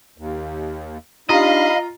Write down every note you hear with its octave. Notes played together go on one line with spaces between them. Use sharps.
D#2
D4 D#4 F4 G4 D#5 F5 A#5 B5